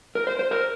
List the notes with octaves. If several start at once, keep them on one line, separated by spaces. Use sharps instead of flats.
A#4
C5
C5
A#4